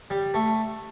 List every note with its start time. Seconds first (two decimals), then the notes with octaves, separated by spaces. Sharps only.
0.10 G3
0.34 A3